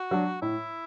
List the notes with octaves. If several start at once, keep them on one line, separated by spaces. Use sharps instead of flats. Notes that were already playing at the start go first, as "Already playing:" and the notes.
Already playing: F#4
F#3 D4
A2 E4